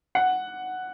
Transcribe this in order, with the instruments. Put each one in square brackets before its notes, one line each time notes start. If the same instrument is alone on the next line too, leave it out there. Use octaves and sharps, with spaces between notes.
[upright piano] F#5